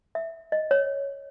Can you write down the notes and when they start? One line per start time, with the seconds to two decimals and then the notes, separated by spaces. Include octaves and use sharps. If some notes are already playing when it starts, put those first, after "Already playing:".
0.15 E5
0.52 D#5
0.71 C#5